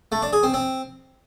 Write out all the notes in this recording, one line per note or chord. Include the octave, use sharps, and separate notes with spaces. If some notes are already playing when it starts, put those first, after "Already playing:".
A3
D4
G#4
C4
C4